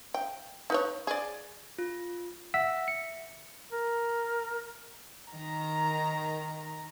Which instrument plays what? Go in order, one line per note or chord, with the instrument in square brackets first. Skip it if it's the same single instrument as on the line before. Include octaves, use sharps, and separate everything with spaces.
[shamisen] G5
D#4 B4 C#5
G#4 D5
[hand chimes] F4
[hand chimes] E5 [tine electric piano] F#5 E6 B6
[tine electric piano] C#7
[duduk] A#4
[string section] D#3 A#5